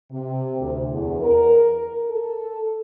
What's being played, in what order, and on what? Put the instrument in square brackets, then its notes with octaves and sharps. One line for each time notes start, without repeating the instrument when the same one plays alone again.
[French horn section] C3
D2
E2
A#4
A4